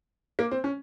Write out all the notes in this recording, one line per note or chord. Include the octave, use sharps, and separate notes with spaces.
A#3
C4
C#4